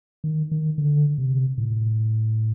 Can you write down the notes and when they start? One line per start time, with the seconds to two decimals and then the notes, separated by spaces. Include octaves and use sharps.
0.24 D#3
0.52 D#3
0.78 D3
1.18 C3
1.58 A2